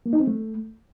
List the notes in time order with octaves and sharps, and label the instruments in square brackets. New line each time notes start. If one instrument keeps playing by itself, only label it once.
[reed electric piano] A#3
D#4
C4
A3